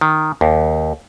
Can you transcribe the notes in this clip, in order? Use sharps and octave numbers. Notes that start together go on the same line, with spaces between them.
D#3
D#2